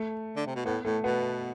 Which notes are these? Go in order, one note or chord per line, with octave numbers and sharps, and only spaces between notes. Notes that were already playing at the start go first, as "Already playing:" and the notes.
Already playing: A3
D3
C3
B2
A2 B3
A2 A3
B2 B3